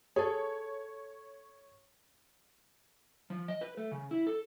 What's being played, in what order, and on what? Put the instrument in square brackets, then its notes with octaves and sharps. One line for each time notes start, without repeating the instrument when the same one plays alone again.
[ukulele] G#4 A4 [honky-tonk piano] C#5
[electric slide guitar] F3
D#5
B4
A3
C#3
E4
A4